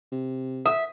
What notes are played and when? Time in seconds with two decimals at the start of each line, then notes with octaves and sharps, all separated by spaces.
0.12 C3
0.66 E5 D#6